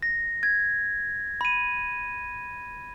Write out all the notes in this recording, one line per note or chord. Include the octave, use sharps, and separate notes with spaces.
A#6
G#6
B5 D#7